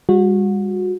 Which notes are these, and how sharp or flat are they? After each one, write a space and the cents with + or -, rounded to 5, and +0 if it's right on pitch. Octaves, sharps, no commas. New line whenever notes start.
G3 +40 F#4 -25